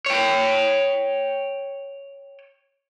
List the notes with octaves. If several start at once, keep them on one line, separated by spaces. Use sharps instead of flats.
C#5 G5